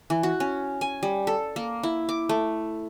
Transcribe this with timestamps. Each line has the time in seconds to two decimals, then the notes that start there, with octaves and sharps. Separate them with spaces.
0.10 E3
0.23 F#4
0.40 C#4
0.81 G#5
1.03 G3
1.27 A4
1.56 A#3
1.83 E4
2.09 D6
2.29 A3